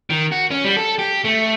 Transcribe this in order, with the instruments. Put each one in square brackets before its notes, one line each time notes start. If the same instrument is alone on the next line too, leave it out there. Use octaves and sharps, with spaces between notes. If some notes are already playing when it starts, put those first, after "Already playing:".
[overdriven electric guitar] D#3
F#4
C#4
G3
A4
G4
A3